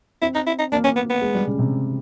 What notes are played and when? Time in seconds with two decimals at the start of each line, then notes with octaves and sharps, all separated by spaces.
0.22 C4 E4
0.35 D#4
0.47 E4
0.59 D#4
0.72 A#3 D4
0.84 C#4
0.96 B3
1.10 B3
1.22 G#3
1.35 G3
1.47 C#3
1.59 C3